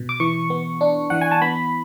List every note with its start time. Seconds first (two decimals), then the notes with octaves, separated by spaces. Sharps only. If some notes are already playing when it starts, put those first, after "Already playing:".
Already playing: B2
0.09 D6
0.20 E3 C#6
0.50 B3
0.81 D4
1.10 E3 F#5
1.21 G#5
1.31 A5
1.42 B3 B5